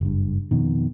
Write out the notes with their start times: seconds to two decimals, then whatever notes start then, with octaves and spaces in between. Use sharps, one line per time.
0.01 F#1 G2
0.51 F2 B2 D#3